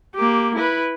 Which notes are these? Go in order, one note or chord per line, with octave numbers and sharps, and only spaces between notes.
A#3 G4
E4 B4